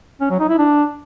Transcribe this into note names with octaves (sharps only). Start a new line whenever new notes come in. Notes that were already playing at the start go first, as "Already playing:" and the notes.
C#4
F#3
D#4
E4
D4